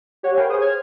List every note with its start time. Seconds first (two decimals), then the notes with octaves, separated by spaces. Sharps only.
0.23 G4 C#5 F#5
0.37 A#4 B4 F5 G5 G#5
0.49 G#4 C5 C#5 D#6
0.61 F6 G#6